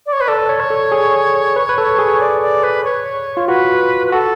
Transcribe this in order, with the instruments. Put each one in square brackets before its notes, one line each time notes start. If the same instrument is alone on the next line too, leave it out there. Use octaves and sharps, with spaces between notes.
[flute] D5
C#5
B4
[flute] A4 [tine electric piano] D5
[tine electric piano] C#5
[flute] C#5
[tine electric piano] A4
G#4
B4
B4
A4
G#4
[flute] D5
D5
B4
C#5
[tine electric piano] F4
[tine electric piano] F#4 [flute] B4
[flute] B4
[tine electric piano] F#4 [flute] A4